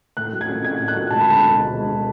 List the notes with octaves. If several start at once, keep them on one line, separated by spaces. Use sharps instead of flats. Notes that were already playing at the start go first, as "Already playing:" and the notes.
A2 F#6
F#3
G#6
C#4
A2 G#6
A2
F#6
F#3
E1 A5
B5
D2 A5
D3
G#3
E1